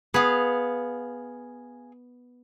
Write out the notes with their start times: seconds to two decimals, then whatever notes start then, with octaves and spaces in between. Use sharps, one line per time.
0.14 B3 G#4 F5